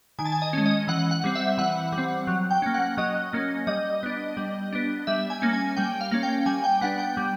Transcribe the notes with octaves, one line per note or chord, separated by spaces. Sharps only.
D#3 G#5
A5
G#5
D#5
G#3 C#4
D#5
E3 F#5
F#5
G3 C4
E5
E3 F#5
G3
C4
F#3
G5
A#3 C#4
F#5
F#3 D#5
A#3 C#4
G3 D#5
B3 D4
G3
B3 D4
G3 E5
G#5
A#3 C#4
G#5
G3 G5
F5
A#3 C#4
G5
G3 G#5
G5
B3 D4 F#5
G5
G3